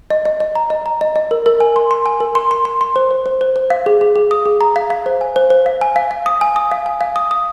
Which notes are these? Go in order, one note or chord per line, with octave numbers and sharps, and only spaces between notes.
D#5
D#5
D#5
A#5
D#5
A#5
D#5
D#5
A#4
A#4
G#5
C6
C6
G#5
A#4
C6
C6
C6
C6
C5
C5
C5
C5
C5
F5
G#4
G#4
G#4
D#6
G#4
A#5
F5
F5
C5
G#5
C5
C5
F5
G#5
F5
F5
D#6
G#5
D#6
F5
G#5
F5
D#6
D#6